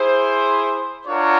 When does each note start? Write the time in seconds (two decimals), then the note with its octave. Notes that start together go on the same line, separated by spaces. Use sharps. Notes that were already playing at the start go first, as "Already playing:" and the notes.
Already playing: E4 G#4 C5
1.07 D4 F4 A#4 C#5 F#5